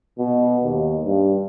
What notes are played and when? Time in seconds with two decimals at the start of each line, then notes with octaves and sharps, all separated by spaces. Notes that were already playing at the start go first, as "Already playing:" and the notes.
0.18 B2
0.63 D#2
1.04 G2